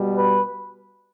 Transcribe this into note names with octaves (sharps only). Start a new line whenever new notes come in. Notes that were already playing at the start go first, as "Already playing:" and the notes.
Already playing: B2 G3
B4